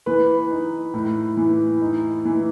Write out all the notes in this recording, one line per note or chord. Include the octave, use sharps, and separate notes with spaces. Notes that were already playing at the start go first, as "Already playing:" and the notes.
E3 B4
D#4
A2
E3
D#4
E3